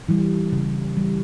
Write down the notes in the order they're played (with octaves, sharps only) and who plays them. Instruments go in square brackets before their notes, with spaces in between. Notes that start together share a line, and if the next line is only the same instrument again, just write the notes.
[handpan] E3 G3
C#3
E3 G3